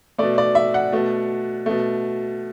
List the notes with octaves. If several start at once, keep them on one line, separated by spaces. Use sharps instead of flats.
B2 A3 D5
D5
E5
F#5
B2 A3
B2 A3